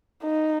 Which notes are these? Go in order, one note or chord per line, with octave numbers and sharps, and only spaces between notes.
D#4